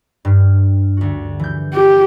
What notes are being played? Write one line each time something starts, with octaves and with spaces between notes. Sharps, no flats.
G2 F6
D2 F#4
E3 G6
G4